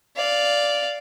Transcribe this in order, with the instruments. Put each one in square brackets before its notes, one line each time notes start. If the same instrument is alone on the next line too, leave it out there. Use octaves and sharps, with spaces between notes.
[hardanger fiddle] D5 F5